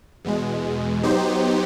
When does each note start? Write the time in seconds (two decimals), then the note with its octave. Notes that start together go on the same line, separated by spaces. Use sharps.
0.25 E2 B2 G#3
1.03 F#3 B3 D#4 G4 C5